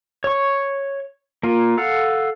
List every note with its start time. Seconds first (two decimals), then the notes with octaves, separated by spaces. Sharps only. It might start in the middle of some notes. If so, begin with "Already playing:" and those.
0.24 C#5 C#6
1.43 A#3 F4
1.77 A4 F5 F#5